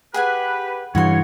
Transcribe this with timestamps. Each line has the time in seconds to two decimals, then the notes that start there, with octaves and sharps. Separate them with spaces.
0.14 G4 G#4 B4 F#5 G#5
0.95 G2 C#3 E3 F#4 C#5 C6